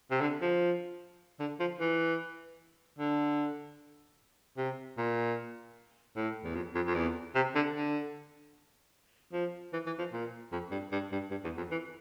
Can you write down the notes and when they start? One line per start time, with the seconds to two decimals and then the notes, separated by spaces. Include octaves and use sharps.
0.11 C3
0.21 D3
0.41 F3
1.40 D3
1.60 F3
1.80 E3
2.99 D3
4.57 C3
4.97 A#2
6.16 A2
6.44 E2
6.55 F2
6.75 F2
6.87 F2
6.95 E2
7.35 C3
7.55 D3
7.74 D3
9.33 F3
9.73 E3
9.86 E3
9.98 F3
10.13 A#2
10.52 F2
10.71 G2
10.92 G2
11.12 G2
11.31 G2
11.44 E2
11.57 F2
11.71 E3